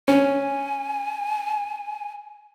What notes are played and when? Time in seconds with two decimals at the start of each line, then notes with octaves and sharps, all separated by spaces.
0.08 C#4 G#5